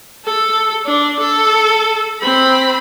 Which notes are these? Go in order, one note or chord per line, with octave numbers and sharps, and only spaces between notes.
A4
D4
A4
C4 B5